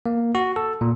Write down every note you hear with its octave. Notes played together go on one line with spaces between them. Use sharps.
A#3
F#4
A4
A#2